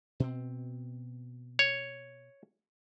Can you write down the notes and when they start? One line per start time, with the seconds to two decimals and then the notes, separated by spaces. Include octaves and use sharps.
0.20 B2 C4
1.59 C#5